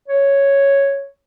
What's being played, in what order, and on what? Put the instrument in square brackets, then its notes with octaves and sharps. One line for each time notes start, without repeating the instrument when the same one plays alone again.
[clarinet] C#5